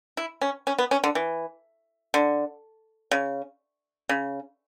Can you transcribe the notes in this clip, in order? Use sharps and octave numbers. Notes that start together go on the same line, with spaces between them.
E4
C#4
C#4
B3
C#4
D3
E3
D3
C#3
C#3